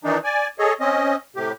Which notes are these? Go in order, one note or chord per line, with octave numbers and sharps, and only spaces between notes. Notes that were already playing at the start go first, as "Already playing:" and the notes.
D#3 E3 D4 D#4
D5 G#5
G#4 A4 C#5 D#5
C4 C#4 D#5
A2 C3 G4